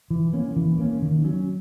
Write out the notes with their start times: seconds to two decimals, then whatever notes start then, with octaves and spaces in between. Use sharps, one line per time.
0.10 E3
0.33 A#3 C#4
0.56 E3
0.79 A#3 C#4
1.02 D#3
1.25 F#3 C#4